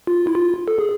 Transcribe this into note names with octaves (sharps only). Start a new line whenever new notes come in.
F4
E4
F4
A4
G#4